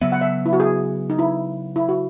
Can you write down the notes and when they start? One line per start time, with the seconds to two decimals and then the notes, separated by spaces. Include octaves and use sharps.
0.01 C#3 F#3 B3 E5
0.12 F#5
0.21 E5
0.46 E4
0.53 F#4
0.60 G#4
1.10 D#4
1.19 E4
1.76 E4
1.89 F#4